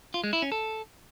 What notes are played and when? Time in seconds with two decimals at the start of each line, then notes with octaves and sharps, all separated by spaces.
0.14 F4
0.24 G#3
0.33 E4
0.42 C#4
0.52 A4